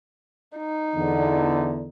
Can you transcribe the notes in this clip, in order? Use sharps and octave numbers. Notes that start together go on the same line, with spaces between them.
D#4
E2 D3